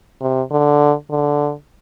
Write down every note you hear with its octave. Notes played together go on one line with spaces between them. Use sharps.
C3
D3
D3